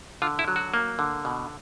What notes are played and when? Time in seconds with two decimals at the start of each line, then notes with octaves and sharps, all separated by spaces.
0.22 D3 F4
0.39 E4
0.48 F#3
0.56 F#4
0.74 A#3
0.99 D3
1.25 B2